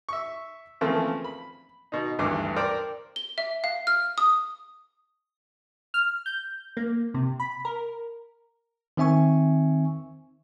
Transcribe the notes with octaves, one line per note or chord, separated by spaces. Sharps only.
E5 C#6
C#3 E3 F3 A3 A#3 C4
B5
B2 D#4
G#1 D2 G2 E3 C6 D6
A#4 C5 D5 G5
G7
E5
F5
F6
D#6
F6
G6
A#3
C3
B5
A#4
D#3 C4 E5 G#5 C#6